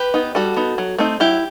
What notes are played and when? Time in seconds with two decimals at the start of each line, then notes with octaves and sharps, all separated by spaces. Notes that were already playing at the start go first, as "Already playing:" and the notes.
Already playing: G4 B4
0.14 B3 D#4
0.35 G3 F#4 A4
0.56 B3 D#4
0.78 F#3
0.98 A3 C4 D#4
1.20 F#3 E4 G4